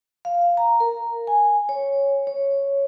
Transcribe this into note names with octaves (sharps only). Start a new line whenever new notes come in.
F5
A#5
A#4
G#5
C#5
C#5